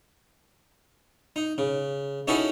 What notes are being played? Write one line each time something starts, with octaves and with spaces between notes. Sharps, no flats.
D#4
C#3
C#4 D#4 E4 F#4 G#4 A4